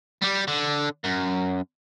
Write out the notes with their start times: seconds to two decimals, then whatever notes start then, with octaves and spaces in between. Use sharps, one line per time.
0.22 G3 G4
0.48 D3
1.04 F#2